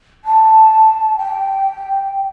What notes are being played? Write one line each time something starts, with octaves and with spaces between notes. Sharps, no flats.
A5
G5